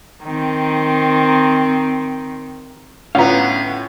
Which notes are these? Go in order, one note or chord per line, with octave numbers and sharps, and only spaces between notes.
D#3 C4
A2 D3 B3 C#4 F4 F5 F#5 A#5